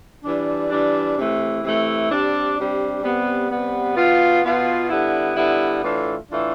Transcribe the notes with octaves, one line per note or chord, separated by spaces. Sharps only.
E3 G3 D4
E3 G3 D4
C3 E3 A3
C3 E3 A3
C3 G3 D4
C3 G3 D4
C3 G3 B3
C3 G3 B3
B2 B3 F4
B2 B3 F4
D3 G3 B3 E4
D3 G3 B3 E4
A2 E3 A3 D4 F4
A2 E3 A3 D4 F4